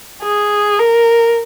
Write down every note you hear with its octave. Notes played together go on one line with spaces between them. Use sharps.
G#4
A#4